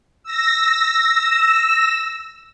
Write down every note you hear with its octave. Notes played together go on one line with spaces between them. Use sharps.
E6 A#6